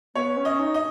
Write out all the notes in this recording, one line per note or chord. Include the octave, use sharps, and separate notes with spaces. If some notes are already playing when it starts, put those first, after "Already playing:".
B3 C#5
C#4
D#5
D#4
D#5